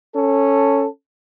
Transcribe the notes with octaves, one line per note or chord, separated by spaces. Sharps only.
C#4 A4